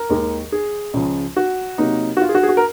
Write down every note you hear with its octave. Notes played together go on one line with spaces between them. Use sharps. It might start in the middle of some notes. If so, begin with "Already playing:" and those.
Already playing: A#4
D#2 D#3 G#3
G#4
C#2 C#3 F3
F#4
C3 F#3 A#3 D#4
F#4
F4
G#4
F#4
G#4
F#4
A#4